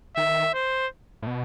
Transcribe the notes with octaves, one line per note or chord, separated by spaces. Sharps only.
D#3 E5
C5
A2
B2